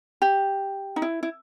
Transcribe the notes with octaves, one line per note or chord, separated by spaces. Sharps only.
G4
D#4
E4
E4